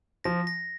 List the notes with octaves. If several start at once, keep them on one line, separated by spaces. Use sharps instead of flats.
F3 A#6
A#6